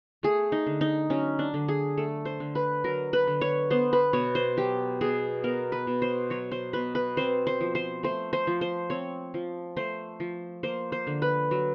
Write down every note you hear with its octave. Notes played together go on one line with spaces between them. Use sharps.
A3 G#4
D#4
D3
D#4
F#3 C#4
D4
D3
G#4
A3 A4
C5
D3
B4
F#3 A#4
B4
D3
C#5
B3 C5
B4
B2 C#5
C5
F#3 G4
B2 G#4
B3 A#4
B4
B2
C5
F#3 C#5
C5
B2 B4
B4
C4 C5
C5
F3
C5
A3 C5
C5
F3
C5
C4 C#5
F3
A3 C5
F3
A#3 C5
C5
D3
B4
F#3